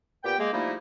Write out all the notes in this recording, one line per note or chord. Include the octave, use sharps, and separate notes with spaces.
A#2 B3 G4 G5
G#3 A#3
F3 G3 A3 A#3 D#4 E4